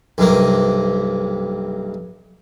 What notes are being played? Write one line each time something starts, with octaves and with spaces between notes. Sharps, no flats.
B1 G2 C3 A#3